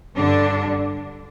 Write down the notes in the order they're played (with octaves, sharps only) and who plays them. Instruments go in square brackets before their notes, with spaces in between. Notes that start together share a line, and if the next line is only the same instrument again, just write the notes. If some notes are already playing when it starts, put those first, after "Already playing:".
[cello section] G2 D3 D4